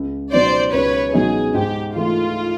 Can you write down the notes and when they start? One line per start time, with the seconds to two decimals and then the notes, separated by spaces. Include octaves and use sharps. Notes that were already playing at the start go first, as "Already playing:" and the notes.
Already playing: C#2
0.32 B2 F#3 B3 D#4 C5 D5
0.73 C#2 B4 C#5
1.13 B2 F#3 B3 D#4 G#4
1.54 G#2 G4
1.95 E3 A3 F4